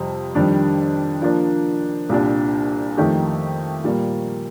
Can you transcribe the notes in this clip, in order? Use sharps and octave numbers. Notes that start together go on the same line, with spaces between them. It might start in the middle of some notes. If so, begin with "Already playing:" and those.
Already playing: F2 C3 G3
F2 D#3 G3 D4
F3 A#3 D4
C2 A#2 G3 D4
F2 D#3 A3 D#4 G4
A#2 G3 A#3